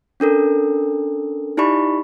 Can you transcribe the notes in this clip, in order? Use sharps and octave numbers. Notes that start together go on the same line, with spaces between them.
C#4 D4 A4 A#4
D#4 E4 G4 D5 B5 C#6